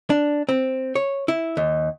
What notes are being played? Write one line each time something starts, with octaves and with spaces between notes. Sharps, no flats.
D4
C4
C#5
E4
D#2